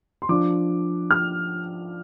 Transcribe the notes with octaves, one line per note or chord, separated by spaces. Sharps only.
C6
F3 D4 D6
F6